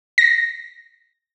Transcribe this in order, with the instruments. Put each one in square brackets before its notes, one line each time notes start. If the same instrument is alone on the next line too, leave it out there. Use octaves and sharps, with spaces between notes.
[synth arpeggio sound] A#6